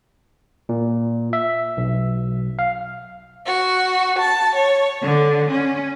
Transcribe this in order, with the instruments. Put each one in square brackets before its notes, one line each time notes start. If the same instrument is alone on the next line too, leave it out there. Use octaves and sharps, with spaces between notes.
[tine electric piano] A#2
E5
B1
F5
[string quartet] F#4
A5
C#5
D3
C#4